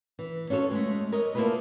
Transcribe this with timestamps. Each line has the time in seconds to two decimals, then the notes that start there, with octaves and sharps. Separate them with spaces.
0.19 E3
0.50 C#4 F4 F#4 A4 C#5
0.71 G#3 A3
1.12 A#4 C#5 D#5
1.35 A3 A#3 E4 F4 G#4 B4